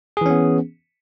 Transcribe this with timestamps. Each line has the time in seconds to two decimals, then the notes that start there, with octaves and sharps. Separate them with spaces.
0.17 G#4
0.21 E3
0.26 C#4
0.30 B3